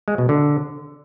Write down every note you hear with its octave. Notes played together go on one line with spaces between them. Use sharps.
G#3
B2
D3